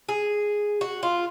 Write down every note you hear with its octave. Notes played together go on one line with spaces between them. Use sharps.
G#4
F#4
F4